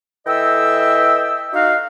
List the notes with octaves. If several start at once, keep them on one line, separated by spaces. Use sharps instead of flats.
E3 A4 D#5 E5 G5 E6
D#4 F#4 F5